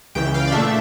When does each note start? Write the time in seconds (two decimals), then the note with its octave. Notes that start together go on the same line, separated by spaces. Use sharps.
0.15 C#2 C#3 E3 G5
0.34 F5
0.47 D5
0.52 A#2 A3 D4 E5